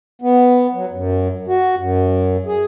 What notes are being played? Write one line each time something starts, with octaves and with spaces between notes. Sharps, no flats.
B3
F#3
F#2
F#4
F#2
G#4